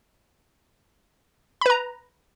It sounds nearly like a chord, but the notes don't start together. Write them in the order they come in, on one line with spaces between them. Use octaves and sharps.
B5 B4 A#5